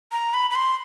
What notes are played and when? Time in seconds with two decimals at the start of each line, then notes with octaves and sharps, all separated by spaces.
0.12 A#5
0.34 B5
0.50 B5
0.55 C6